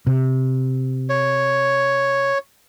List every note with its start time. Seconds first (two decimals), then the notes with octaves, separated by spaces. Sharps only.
0.07 C3
1.09 C#5